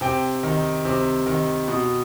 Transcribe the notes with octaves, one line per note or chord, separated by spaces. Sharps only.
C3 G5
D#3
C3
D#3
B2